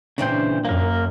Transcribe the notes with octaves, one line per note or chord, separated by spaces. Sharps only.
A#2 C#3 E3 C4 D4 C5
F#2 A#3 A#4